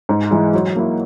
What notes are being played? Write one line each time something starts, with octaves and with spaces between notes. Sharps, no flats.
G#2
E3 G#3
F#3
A#3 E4